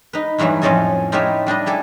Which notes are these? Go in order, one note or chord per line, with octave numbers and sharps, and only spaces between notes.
D#4 B4
E2 G2 E3 F#3 A3
F2 A2 C#4 A4 D#5 G#5
D#4 F4 G4 B4 C#5 E5
G3 D4 G4 D#5
E4 G4 A4 G#5